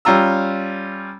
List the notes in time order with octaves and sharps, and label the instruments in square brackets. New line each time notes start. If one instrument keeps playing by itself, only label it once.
[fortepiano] G3 C#4 F4 A#5 E6